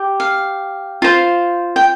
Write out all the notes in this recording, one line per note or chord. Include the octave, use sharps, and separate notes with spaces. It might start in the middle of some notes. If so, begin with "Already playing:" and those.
Already playing: G4
F5
F4 C5
G5